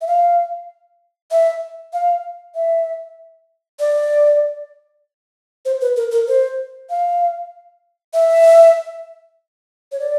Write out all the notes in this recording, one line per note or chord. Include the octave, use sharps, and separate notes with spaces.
E5
F5
E5
F5
E5
D5
C5
B4
A#4
A#4
C5
F5
E5
C#5
D5